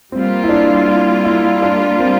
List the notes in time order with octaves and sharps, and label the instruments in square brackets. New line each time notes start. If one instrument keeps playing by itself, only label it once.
[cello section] G3 A#3 F4 [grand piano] C4
[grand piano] E4
D4
E4
E4
D4
C4